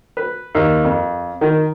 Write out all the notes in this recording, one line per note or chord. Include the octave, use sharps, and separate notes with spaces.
B4
D#2
F2
D#3